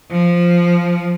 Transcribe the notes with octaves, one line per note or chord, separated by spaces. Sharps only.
F3